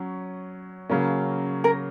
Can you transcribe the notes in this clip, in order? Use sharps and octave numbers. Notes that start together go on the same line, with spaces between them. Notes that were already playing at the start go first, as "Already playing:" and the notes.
Already playing: F#3 C#4
C#3 F#3 A#3 C#4
A#4